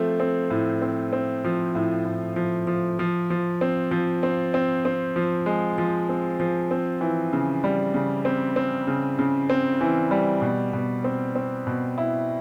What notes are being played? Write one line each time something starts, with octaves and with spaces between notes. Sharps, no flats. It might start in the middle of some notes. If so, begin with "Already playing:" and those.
Already playing: F3 A3 C4
C4
A2
C4
C4
F3
A2
A2
F3
F3
F3
F3
C4
F3
C4
C4
C4
F3
G#3
F3
C4
F3
C4
E3
C#3
G3
C#3
C4
C4
C#3
C#3
C4
E3
G3
B2
B2
C4
C4
B2
E4